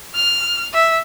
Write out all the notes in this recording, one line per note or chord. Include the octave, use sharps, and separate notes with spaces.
F6
E5